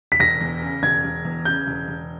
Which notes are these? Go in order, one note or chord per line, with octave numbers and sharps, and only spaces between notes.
B6
E1 A#6
E2
C#3
E1 G#6
E1
E2
C#3 G6
E1
E1